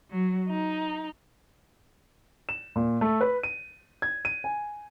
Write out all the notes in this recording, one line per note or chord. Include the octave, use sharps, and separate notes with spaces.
F#3
D#4
E7
A#2
A3
B4
D#7
G#6
D#7
G#5